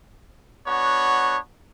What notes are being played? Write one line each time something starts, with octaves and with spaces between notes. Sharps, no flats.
B3 D4 F#4 C#5